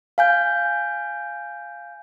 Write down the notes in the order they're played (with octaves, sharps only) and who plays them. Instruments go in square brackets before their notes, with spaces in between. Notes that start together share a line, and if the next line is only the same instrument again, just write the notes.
[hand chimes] F5 G#5 G6